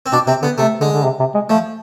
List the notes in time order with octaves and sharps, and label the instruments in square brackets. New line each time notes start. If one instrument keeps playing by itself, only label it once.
[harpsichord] C4
[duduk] B2 [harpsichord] D4
[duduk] C3 [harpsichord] C4
[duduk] D3 [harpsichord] B3
[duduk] C3 [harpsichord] A3
[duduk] D3 [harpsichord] G#3
[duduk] D3
C3
C3
G#3
[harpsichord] F3 [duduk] A3